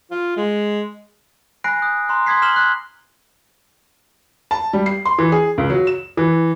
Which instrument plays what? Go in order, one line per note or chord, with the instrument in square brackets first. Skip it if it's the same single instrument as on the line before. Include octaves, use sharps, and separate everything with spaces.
[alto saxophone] F4
G#3
[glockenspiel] G#5 B5 F#6 A#6 C7 D7
D#6 F#6 G6
A#5 C6 F#6
C6 D6 D#6 G#6 B6 C7
F6 B6 E7 F#7 G7
F#6
[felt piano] A5
G3
C7
C6
E3
G#4
C#2
F#3
E7
E3